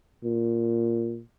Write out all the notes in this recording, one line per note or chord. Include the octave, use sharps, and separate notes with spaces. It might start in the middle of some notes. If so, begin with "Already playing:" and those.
A#2